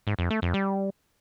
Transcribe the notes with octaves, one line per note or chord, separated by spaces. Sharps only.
G#2
F2
A3
F2
G3